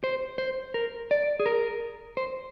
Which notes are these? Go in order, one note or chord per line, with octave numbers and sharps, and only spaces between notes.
C5
C5
A#4
D5
G#4
A#4
C5